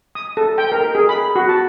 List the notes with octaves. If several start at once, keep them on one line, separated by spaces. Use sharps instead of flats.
D#6
A4
G5
A#4
G#4
B5
F#4
A5